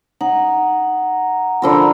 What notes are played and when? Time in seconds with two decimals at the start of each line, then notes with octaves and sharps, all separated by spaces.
0.21 D#4 F#5
1.62 D3 F3 A#4 B5 E6